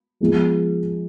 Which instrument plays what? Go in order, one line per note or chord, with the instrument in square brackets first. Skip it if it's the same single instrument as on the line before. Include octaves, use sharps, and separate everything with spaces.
[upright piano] F3 G#3 B3